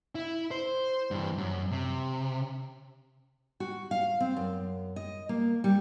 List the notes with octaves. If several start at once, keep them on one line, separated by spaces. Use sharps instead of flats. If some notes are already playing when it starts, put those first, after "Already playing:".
E4
C5
G2 E3
F#2
C3
F#4
F5
C4
F#2
D#5
A#3
G3